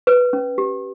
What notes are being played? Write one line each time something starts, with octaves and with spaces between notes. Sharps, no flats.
B4
C#4
G4